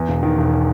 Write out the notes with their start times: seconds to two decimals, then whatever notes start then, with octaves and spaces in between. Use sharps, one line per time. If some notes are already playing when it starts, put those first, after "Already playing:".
Already playing: E2
0.09 E1
0.23 D#3
0.38 E1